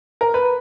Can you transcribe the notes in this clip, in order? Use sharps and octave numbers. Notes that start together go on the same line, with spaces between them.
A#4
B4